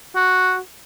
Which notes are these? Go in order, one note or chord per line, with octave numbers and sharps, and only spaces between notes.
F#4